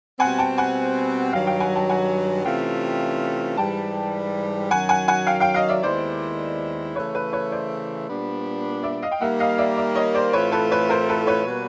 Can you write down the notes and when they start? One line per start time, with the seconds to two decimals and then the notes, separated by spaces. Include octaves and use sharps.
0.20 B2 G3 C4 F#5 G#5
0.38 G5 A5
0.58 F#5 G#5
1.33 G2 D#3 F#3 F5 G5
1.47 F5 G5
1.60 F#5 G#5
1.75 G5 A5
1.89 F#5 G#5
2.45 C3 E3 A3 C#4 F4 F5 G5
3.57 G#2 E3 G3 G5 A5
4.71 F#2 D#3 F#3 F#5 G#5
4.89 F#5 G#5
5.08 F#5 G#5
5.27 F5 G5
5.40 F5 G5
5.54 D#5 F5
5.69 D5 E5
5.83 D#2 D#3 G#3 B3 E4 C5 D5
6.95 C#3 E3 A3 B4 C#5
7.15 B4 C#5
7.33 B4 C#5
7.51 C5 D5
8.09 A#2 G3 B3 D4
8.83 D5 E5
9.02 D#5 F5
9.11 G5
9.21 D#3 G3 A#3 E5 F#5
9.39 D#5 F5
9.58 D5 E5
9.77 D5 E5
9.95 C#5 D#5
10.14 C5 D5
10.33 A2 E3 A3 C4 F4 B4 C#5
10.52 A4 B4
10.71 B4 C#5
10.89 A#4 C5
11.09 A4 B4
11.27 B4 C#5
11.46 B2 G3 A#3